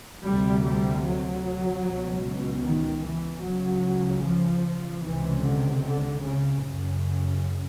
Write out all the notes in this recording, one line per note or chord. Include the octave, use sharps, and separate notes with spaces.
D2 C3 G3
G3
F#3
C#2 B2
D#3
E3
C#2 C#3 F#3
F3
C#2 C3 E3
D3
D3
C#3
F#2 C#3